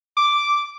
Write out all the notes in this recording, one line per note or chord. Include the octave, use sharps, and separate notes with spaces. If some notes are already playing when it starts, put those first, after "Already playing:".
D6